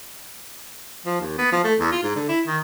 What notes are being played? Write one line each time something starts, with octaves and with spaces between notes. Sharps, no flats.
F3
D#2
B3
F3
A3
E2
F4
G#2
D3
E4
D#3